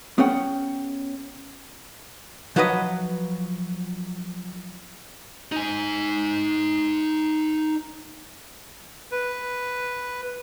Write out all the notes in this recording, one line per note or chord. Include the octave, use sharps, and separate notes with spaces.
B3 C#4 G#4 F#5 G5
F3 F#3 F#4 B4 C5 D#5
D#4 G#5
B4